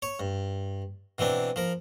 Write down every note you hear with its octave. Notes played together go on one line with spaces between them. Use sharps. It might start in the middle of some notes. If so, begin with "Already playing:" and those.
C#5
G2
B2 E3 C4 D4
F3 A#4